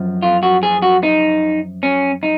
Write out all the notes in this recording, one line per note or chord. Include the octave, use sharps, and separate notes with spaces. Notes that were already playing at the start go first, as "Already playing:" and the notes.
Already playing: F#2 F3
F4
F#4
G#4
F#4
D#4
C#4
D#4